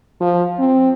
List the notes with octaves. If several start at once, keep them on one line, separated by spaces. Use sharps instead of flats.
F3
C4